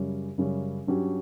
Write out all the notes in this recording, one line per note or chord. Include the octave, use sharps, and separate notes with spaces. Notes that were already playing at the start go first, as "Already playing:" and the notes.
Already playing: F#2 C#3 G3 C#4
F#2 C#3 G3 C#4
G2 F#3 C#4 G4 C#5